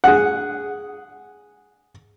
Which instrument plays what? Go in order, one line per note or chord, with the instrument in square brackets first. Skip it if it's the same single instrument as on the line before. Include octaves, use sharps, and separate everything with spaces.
[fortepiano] G#4 F#5